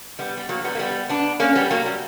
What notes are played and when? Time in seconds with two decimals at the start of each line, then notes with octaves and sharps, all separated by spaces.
0.19 G3 B3
0.37 G3
0.49 F#3 A#3
0.64 G3 B3
0.75 A#3
0.79 G3 B3
1.09 B3 D4
1.40 A#3 C#4
1.55 G3 B3
1.71 F#3 A#3
1.86 G3